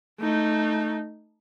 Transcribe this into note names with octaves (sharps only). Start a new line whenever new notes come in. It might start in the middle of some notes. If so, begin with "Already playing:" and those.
A3 D#4